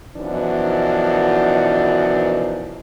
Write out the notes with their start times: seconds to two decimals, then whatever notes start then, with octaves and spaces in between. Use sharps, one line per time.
0.17 F#2 B2 E3 F3 D4 D#4